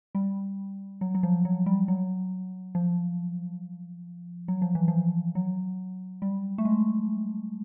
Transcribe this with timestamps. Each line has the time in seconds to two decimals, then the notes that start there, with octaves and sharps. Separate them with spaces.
0.15 G3
1.01 F#3
1.15 F#3
1.23 F3
1.45 F#3
1.66 G3
1.88 F#3
2.75 F3
4.48 F#3
4.62 F3
4.75 E3
4.88 F3
5.35 F#3
6.22 G3
6.58 A3
6.65 G#3